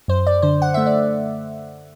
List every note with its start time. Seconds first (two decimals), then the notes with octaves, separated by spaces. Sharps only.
0.08 F#2 C5
0.27 D5
0.42 D3 C5
0.62 F#5
0.74 A3 E5
0.86 D5